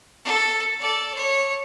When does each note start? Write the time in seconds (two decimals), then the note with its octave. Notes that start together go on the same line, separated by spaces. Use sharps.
0.24 A4
0.79 A4 D5
1.14 C#5